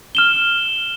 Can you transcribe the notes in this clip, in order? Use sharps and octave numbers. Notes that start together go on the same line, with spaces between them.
F6 E7 G7